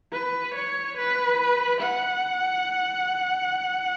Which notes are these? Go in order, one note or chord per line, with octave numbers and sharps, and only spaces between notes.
B4
C#5
B4
F#5